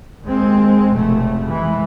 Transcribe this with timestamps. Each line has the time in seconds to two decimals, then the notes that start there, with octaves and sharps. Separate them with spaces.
0.23 D#2 G#3 C4
0.93 F1 B2 A3
1.45 E3 G#3